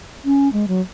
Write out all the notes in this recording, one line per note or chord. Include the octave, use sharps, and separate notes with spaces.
C#4
G#3
F#3